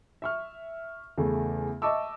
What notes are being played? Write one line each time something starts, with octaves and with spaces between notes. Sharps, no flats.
E5 C#6 F6
E2 C#3 A3
D#5 E5 A5 C#6 D6 E6